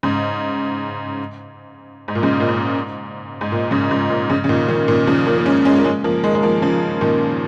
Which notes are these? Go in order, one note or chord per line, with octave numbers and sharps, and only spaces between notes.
G#2 C#3
G#2
A#2
G#2 C#3
A#2
G#2
G#2
A#2
G#2 C#3
G#2 C#3
A#2
G#2 C#3
C#3
A#2 D#3
A#2 D#3
A#2 D#3
C#3 F3
F3 A#3
A#3
G#3 C#4
G#3 C#4
A#3
G#3 C#4
F3 A#3
D#3 G#3
G#3
F3 A#3
C#3 F3
A#2 D#3